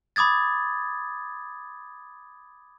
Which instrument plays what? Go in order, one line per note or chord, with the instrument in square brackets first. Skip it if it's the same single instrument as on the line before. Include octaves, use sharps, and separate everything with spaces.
[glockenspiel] B5 D6 D#6 G#6 A6